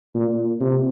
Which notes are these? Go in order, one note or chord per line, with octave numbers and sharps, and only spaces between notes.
A#2
C3